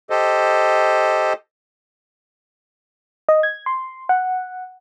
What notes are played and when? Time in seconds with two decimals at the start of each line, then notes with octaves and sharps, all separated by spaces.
0.10 G4 A4 C5 D#5
3.29 D#5
3.43 G#6
3.66 C6
4.09 F#5